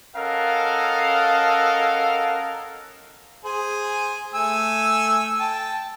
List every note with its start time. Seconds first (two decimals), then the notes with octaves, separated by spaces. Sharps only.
0.16 C#4 A4 A#4 D#5 F5 F#5
3.45 G#4 C5 G#5
4.34 A3 G#5 E6
5.40 G5 A5